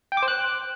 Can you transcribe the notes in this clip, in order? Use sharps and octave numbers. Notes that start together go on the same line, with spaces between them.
G5
D6
C5
F#6